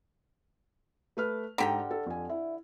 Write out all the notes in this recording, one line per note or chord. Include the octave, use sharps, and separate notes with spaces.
A3 B4 F6
G#2 D3 G4 G5 A#5
A4
F2 G#5
E4